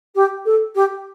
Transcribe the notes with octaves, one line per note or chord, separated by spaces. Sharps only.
G4
A4
G4